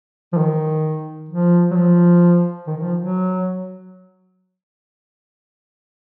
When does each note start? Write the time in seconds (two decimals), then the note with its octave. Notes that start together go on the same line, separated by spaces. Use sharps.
0.33 F3
0.37 D#3
1.29 F3
1.71 F#3
1.75 F3
2.67 D#3
2.78 D#3
2.82 F3
2.97 F#3